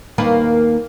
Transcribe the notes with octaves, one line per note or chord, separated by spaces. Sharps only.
D#2 A#3 B4